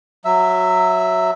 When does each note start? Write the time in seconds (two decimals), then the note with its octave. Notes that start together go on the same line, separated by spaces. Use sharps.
0.25 F#3 E5